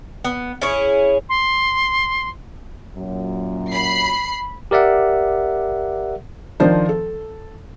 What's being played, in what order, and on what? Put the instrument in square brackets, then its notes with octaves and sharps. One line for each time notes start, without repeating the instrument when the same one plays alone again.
[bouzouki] B3
C#4 E4 G#4 C#5
[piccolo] C6
[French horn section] F#2 A#2 F#3
[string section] B5 C7
[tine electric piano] G4 A#4 D5 E5 F#5
[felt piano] D#3 F3 D4 C5
A4